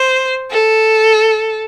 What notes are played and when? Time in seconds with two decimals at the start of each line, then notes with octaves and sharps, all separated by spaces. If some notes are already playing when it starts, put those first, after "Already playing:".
Already playing: C5
0.51 A4